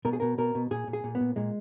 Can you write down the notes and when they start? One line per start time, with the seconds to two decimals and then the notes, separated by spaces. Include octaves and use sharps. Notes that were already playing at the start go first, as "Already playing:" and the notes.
0.05 B2 A#4
0.13 G#4
0.20 B2 A#4
0.38 B2 A#4
0.55 B2
0.71 A#2 G#4
0.87 A#2
0.93 G#4
1.04 A#2
1.15 B3
1.20 A#2
1.36 A#2 G#3